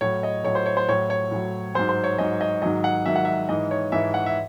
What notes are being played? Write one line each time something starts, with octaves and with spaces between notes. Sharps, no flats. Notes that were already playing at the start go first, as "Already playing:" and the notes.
A2 F#3 C#5
D#5
A2 F#3 C#5
C5
C#5
C5
A2 F#3 C#5
C#5
A2 F#3
G#2 F#3 C5
C5
C#5
G#2 F#3 D#5
D#5
G#2 D#3 F#3 D#5
F#5
G#2 D#3 F#3 E5
F#5
E5
G#2 E3 D#5
C#5
G#2 E3 E5
F#5
E5